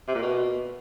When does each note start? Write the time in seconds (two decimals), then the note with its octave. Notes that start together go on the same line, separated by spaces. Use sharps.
0.08 C3
0.15 A#2
0.22 B2